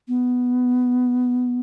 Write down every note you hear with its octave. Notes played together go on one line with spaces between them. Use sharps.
B3